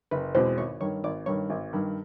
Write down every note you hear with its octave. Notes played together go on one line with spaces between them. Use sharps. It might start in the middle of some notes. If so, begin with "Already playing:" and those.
F#1 B4
E2 B2 G#3 C4 C5
G#1 C#5
G2 D#3 C#5
G#1 D5
G2 D#3 C#5
G#1
G2 D#3